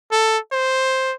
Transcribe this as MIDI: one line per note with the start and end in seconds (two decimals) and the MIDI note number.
0.11 0.38 69
0.52 1.13 72